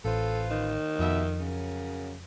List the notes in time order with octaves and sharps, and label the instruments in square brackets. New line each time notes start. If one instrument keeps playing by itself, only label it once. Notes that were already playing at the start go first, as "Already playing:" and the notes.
[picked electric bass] A1 [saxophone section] F4 B4 C5 [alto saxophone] A4
[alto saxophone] D#3
[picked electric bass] F2 [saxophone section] B2 E5
[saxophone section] C#3 F#3 A#4